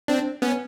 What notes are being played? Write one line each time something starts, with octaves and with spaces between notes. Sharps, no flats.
C4 D4
B3 C#4